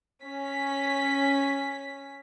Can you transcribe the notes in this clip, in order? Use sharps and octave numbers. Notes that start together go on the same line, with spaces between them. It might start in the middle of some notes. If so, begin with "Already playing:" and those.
C#4 B6